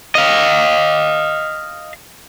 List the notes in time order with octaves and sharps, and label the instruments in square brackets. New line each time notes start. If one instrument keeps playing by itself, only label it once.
[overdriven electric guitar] D#5 F5